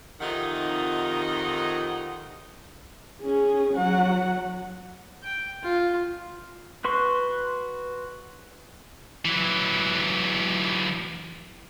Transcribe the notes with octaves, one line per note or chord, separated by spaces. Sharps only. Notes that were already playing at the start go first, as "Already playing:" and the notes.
F2 C3 D#3 D#4 F4 F#5
C#4 G#4
F#3 F#5
G5
F4
F#4 B4 C6 C#6
E3 F#3